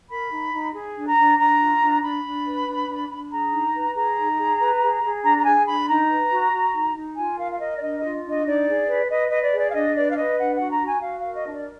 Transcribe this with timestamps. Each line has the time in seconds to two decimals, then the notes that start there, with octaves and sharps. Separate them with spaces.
0.10 A#4 B5
0.32 D#4
0.53 D#4
0.74 G#4
0.96 D4
1.07 A#5
1.17 D4
1.39 D4 A#5
1.60 F4
1.82 D4
2.03 D4 B5
2.25 D4
2.46 B4
2.68 D4
2.88 D4
3.10 D4
3.32 G#4 A#5
3.53 D#4
3.74 B4
3.96 G#4 A#5
4.17 D#4
4.39 G#4
4.60 B4
4.82 G#4
5.03 G#4
5.24 D4 A#5
5.39 A#5
5.46 G#4 G#5
5.67 D4 B5
5.89 D#4 A#5
6.10 B4
6.31 F#4
6.53 F#4
6.74 D#4
6.96 D#4
7.17 F4 G#5
7.38 A#4 F5
7.51 F5
7.60 A#4 D#5
7.77 D5
7.82 D4 D#5
7.98 D#5
8.03 F4
8.24 D4
8.30 D#5
8.46 D#4 D5
8.67 G#4
8.88 B4
9.10 B4 D#5
9.31 B4 D#5
9.42 D5
9.53 G#4
9.58 D5
9.70 F5
9.74 D4 D#5
9.95 B4 D5
10.10 F5
10.17 B4 D#5
10.39 D4 F#5
10.55 F#5
10.60 F#4
10.71 A#5
10.82 F#4
10.87 G#5
11.03 F#4 F5
11.19 F5
11.25 A#4
11.35 D#5
11.46 D4
11.51 D5